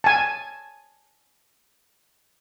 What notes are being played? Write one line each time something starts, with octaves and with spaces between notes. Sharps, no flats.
G#5 A5